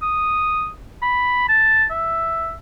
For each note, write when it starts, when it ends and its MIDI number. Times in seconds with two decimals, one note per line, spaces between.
0.02 0.70 87
1.02 1.44 83
1.49 1.85 81
1.91 2.54 76